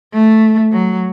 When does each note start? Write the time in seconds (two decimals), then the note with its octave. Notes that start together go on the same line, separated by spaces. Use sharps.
0.14 A3
0.72 F#3